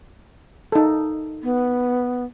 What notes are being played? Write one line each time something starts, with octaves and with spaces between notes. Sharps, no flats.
D#4 A4
B3